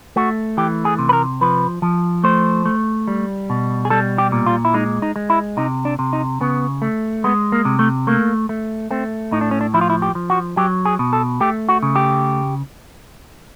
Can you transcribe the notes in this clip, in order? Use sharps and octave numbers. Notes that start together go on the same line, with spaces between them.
A3 F#4
E3 G4
G#4
C3
B4
A#4
F3 B4
F3
A3 C5
A3
G3
B2
G#4
G3 A4
G4
A#2
F4
E4
G#3 D#4
D#4
G#3
E4
C3 D#4
D4
C3
D#4
C#3 B3
A3
G#3 B3
A#3
C3
A3
A3 A#3
A3
A3 C4
A2 D#4
D4
C#4
D4
F3 E4
F4
E4
G4
F3
F#4
F#3 G4
G#4
B2
A4
A3 G4
F#4
C#3
G4